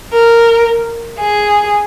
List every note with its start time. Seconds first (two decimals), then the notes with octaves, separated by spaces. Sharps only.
0.13 A#4
1.20 G#4